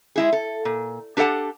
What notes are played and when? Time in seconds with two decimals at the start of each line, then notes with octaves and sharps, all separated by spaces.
0.16 G#3 E4 G#4
0.33 A4
0.65 A#2
1.17 D4 G4 A4 C#5 F#5 A5